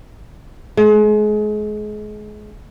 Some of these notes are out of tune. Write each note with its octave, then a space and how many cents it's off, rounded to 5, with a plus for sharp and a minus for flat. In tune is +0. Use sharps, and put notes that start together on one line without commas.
G#3 +30